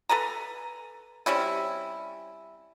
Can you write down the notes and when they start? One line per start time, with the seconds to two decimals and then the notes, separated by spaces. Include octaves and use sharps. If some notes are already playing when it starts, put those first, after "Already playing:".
0.09 A4 B4 G#5 A#5
1.26 G3 C4 C#4 E4